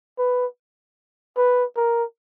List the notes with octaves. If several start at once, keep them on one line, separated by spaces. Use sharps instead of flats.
B4
B4
A#4